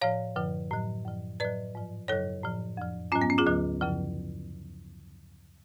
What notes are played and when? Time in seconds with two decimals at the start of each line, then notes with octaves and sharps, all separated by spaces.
0.01 A2 F3 C#5 F5
0.36 F#2 D3 F3
0.71 A2 F#3
1.05 F#2 F3
1.40 A2 F#3 B4 D5
1.75 G#2 F3
2.08 F#2 C#3 F#3 A4 C#5
2.43 A2 F3
2.77 F2 F3
3.12 G#2 C#4 F4
3.15 F#3
3.22 B3
3.30 C#4
3.38 F4 G#4
3.46 D2 D3 F#3
3.81 F#2 C#3 F3